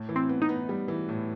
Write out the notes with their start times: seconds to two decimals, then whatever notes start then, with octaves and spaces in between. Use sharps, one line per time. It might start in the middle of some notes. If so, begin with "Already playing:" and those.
Already playing: A2
0.09 E3
0.16 C4
0.29 B3
0.42 D#4
0.49 B3
0.69 G3
0.88 E3
1.09 A2